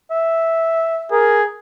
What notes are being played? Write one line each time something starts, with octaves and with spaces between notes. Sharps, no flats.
E5
G#4 A#4